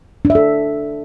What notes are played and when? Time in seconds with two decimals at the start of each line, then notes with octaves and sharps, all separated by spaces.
0.25 D4
0.30 E5
0.35 A4